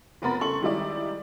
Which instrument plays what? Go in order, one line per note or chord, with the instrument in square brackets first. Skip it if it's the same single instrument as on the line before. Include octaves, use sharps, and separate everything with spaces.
[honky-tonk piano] F1 B3 A#4 B5 A6
C#3 A4 C6 C#6 F#7
D#3 G3 G#3 D#4 E4 D5